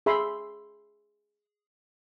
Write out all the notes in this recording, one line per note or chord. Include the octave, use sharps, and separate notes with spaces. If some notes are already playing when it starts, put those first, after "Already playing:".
G#4 E5 B5 C6